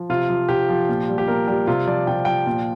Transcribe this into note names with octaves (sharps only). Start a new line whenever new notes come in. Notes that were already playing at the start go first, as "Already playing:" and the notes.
Already playing: F3
C3 F4
F3
C3 G4
F3
A#2
G3
G4
A#2 A#4
G3 G4
C3 F4
F3 D5
C3 G5
F3 G5
A#2